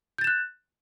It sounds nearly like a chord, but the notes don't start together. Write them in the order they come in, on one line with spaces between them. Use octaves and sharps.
G6 A6 E7 F#6